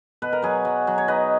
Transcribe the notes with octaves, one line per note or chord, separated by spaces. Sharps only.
B2 B4
A#4
F#3 G#4 B4
F#3
F#3
C#5
D#4 B4 D#5